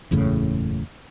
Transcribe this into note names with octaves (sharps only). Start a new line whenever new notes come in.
F#1 E2 A2 C#3